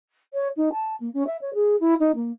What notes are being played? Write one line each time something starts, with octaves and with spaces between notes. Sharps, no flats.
C#5
D#4
A5
A#3
C#4
E5
C#5
G#4
E4
D#4
A#3